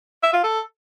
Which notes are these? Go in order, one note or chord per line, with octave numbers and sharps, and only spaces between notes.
E5
F4
A4